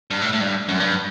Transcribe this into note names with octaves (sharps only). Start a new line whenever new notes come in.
G2
A2
A2
G2
F#2
G2